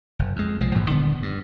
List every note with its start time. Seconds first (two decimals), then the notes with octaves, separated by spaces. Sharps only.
0.19 F#1
0.36 F2 G#3
0.60 B1 F3 G#3
0.74 A1 G#2 E3
0.89 D#1 D3 B3
1.22 G2